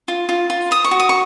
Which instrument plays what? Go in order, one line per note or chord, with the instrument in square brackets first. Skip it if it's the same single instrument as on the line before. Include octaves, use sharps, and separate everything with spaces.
[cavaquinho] F4
F4
F4
C5 D#6
C#6
F#4
D#6
C#6